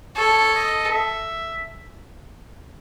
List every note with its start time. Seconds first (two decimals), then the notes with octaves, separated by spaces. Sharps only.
0.16 A4 C#5
0.55 D#5
0.94 E5